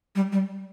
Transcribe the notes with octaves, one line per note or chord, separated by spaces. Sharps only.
G3
G3